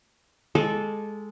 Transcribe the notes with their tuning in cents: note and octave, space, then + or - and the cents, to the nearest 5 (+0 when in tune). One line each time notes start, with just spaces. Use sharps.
G#3 +0 A4 -15 D6 +0